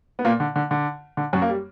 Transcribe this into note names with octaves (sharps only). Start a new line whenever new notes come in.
B3
A#2 A#3
D3
D3
D3
D3
F#2 F#3
A#3
G3